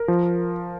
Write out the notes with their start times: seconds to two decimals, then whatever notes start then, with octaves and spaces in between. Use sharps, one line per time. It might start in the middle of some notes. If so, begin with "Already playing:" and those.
Already playing: A#4
0.08 F3